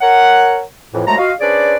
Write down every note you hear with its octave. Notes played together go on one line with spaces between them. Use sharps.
A#4 C#5 F#5
F2 A2 E3
C2 F#3 G#3 A3 A5 A#5
F4 F#4 D#5 F5
C#4 D4 G#4 B4 C5 D5